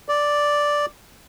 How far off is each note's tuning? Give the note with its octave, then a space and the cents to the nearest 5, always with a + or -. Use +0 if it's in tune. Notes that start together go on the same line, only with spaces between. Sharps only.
D5 -5